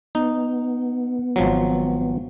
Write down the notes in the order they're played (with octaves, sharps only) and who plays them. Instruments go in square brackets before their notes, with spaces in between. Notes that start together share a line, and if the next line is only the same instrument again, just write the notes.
[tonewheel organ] B3 [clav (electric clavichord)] D#4
[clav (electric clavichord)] G#1 F3 F#3